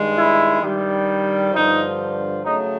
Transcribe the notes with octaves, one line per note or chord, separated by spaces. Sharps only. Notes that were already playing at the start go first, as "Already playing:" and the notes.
Already playing: G2 D#3 G#3
E4
G2 D#3 G3
G2 D3 F3 D#4
C#3 F#3 A3 D#4